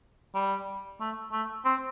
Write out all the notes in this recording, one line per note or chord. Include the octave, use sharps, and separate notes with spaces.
G3
A3
A3
C4